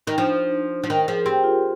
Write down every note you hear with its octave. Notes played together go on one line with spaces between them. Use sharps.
D#3 D#4
F3 D4
C5
F3
D#3 A#4
F3 G#4
C4 G4
F4